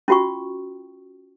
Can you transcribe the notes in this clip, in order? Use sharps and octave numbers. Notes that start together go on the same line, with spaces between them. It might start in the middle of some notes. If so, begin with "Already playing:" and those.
C#4 F4 F#4 G5 C#6